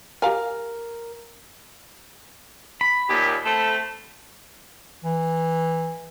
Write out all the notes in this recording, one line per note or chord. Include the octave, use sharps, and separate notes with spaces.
G4 A#4 F5 G#5
B5
D#2 A#2 G4
A3 C4 A4
E3